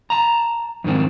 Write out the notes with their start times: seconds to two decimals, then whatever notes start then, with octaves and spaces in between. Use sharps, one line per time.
0.10 A5 A#5
0.84 F2 G#2 D#3 C4